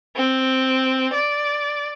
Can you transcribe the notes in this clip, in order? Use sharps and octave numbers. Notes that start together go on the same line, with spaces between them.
C4
D5